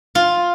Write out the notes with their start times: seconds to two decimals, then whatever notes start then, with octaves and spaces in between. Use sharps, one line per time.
0.15 F4